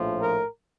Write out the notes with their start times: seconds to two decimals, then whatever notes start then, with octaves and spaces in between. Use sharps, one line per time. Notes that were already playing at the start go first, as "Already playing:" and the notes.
Already playing: A#1 A2 F3
0.21 A#4